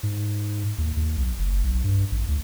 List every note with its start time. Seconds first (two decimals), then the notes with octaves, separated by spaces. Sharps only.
0.03 G#2
0.78 D#2
0.97 D#2
1.17 B1
1.39 F#1
1.64 B1
1.84 G2
2.11 A1
2.28 D2